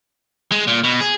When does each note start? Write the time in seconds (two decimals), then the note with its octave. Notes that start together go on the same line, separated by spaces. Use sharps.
0.52 G#3
0.67 A#2
0.84 B2
1.01 G#4